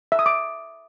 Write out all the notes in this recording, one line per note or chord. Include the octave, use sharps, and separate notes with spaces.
E5
D#6
D6